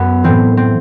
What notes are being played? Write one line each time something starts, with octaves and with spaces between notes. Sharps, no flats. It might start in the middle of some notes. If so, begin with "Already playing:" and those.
Already playing: F#2 B3
A2 E3 C4
C4